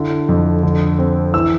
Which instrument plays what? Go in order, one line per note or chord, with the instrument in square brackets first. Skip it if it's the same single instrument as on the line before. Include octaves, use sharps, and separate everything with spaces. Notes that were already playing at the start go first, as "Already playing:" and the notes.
Already playing: [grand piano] D3 E4
F2
D3
C4
E3 E6